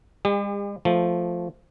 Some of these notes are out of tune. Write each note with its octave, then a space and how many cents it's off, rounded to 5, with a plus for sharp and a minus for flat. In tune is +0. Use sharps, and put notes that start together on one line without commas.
G#3 -45 G4 +40
F3 +0 A3 +0